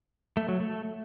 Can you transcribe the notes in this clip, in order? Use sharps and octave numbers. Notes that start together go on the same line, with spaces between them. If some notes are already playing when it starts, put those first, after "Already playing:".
A3
F#3
A3